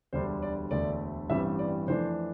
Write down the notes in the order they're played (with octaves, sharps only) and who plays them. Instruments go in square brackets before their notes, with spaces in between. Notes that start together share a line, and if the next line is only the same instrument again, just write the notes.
[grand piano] E1 D2 D3 G3 D4 C5
D5
E1 D2 D3 A3 D5
A1 G2 E3 G3 C4 E5
D5
F2 E3 A3 D4 C5